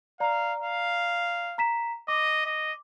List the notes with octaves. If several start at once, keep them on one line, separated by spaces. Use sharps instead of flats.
D5 F5 A#5
F5
A#5 B6 E7
D#5 D6
D#5